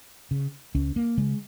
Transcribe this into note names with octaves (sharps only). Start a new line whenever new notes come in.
C#3
C#2 C#4
A#3
C#3 G#3